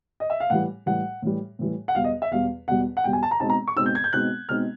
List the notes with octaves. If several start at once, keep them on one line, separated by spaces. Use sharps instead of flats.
D#5
E5
F5
A2 E3 G3 F#5
A2 E3 G3 F#5
A2 E3 G3
A2 E3 G3
F#5
E2 B2 G3 F5
D#5
E5
E2 B2 G3 F5
E2 B2 G3 F#5
F#5
E2 B2 G3 G5
G#5
A5
A#5
B2 G#3 C4 D#4 A5
A#5
C#6
B2 G#3 C4 D#4 E6
G6
G#6
G6
B2 G#3 C4 D#4 F#6
B2 G#3 C4 D#4 F6